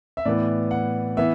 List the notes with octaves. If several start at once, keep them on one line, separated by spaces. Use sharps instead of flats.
E5
A2 E3 B3 D5
F#5
E3 B3 E5